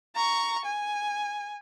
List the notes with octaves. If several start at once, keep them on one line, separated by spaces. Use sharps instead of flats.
A#5 C#6
G#5